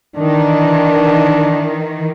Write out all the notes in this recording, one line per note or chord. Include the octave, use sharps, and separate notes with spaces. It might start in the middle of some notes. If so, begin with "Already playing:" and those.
D#3 E3 D4